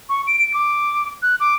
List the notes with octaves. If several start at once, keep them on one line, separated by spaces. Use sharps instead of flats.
C#6
D7
D7
D6
F#6
D6